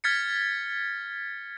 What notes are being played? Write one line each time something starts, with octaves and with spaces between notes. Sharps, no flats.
F6 G#6 A6 B6 C#7